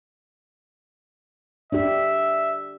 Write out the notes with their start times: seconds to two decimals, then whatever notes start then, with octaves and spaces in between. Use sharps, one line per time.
1.72 D4 G4 E5